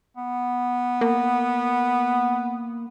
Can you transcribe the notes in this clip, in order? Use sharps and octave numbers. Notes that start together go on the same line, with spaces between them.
B3
A#3